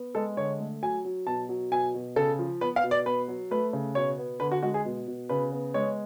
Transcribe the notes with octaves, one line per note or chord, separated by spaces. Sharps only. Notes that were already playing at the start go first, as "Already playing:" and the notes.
Already playing: B3
G#3 A4
D3 C#5
A3
F#3 G#5
F#3
B2 A5
F#3
B2 G#5
B2
C#3 A4
F3
B3 B4
F5
B2
D5
B3 B4
F#3
A3 B4
C#3
B2 C#5
B3
D3 B4
F#4
G#3 F#4
G#4
B2
B2
C#3 B4
B3
G#3 C#5